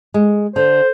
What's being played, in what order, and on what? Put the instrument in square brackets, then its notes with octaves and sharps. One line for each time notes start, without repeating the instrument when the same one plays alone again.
[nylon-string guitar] G#3
[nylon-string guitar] D3 [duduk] C5